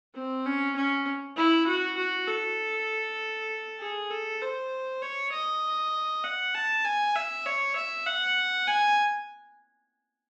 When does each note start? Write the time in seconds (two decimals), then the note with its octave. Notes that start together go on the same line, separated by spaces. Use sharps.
0.15 C4
0.46 C#4
0.76 C#4
1.37 E4
1.67 F#4
1.98 F#4
2.28 A4
3.80 G#4
4.11 A4
4.42 C5
5.02 C#5
5.33 D#5
6.24 F#5
6.55 A5
6.85 G#5
7.15 E5
7.45 C#5
7.76 E5
8.06 F#5
8.67 G#5